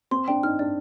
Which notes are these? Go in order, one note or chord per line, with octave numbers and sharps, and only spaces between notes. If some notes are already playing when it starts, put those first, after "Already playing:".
C4 C6
D4 G5
D#4 F6
D4 D5